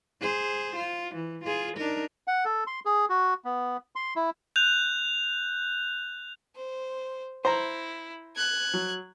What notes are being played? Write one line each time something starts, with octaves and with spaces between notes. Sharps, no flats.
G#4 C5
F4
E3
F4 G#4
D4 D#4 A#4
F#5
A4
C6
G#4
F#4
B3
C6
E4
F#6 G6 F7
C5
E4 C5 A#5
F#6 G#6
F#3